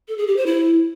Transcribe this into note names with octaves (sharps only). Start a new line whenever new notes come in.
A4
G#4
G4
C5
E4